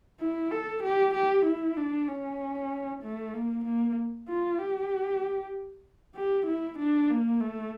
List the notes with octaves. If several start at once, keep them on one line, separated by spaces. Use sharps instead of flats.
E4
A4
G4
G4
E4
D4
C#4
A3
A#3
A#3
F4
G4
G4
E4
D4
A#3
A3